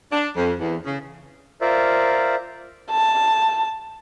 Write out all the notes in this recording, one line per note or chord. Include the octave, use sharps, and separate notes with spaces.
D4
F2
E2
C#3
F4 A#4 C5 D5 E5
A5